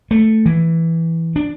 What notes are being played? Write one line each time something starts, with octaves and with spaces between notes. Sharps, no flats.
A3
E3
D4